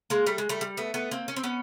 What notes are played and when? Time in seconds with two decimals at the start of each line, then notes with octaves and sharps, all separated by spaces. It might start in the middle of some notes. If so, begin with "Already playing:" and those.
0.10 G#3 A#3
0.27 G3 A3
0.38 G#3
0.49 G3 A3
0.61 G3
0.77 A3 B3
0.94 A3 B3
1.11 A#3 C4
1.28 C#4
1.36 C4
1.43 B3 C#4